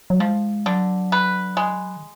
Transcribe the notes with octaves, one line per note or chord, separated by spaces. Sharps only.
F#3
F3 G#3
D3 F#3
B4
G#3
D#3